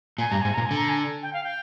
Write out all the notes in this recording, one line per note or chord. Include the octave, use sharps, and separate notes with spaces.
A#2 G#5
G2 A#5
G#2 G#5
A#2 A#5
D3 G#5
A#5
G#5
G5
F5
G5